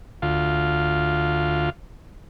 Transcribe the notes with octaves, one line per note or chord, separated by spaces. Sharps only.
D2 F4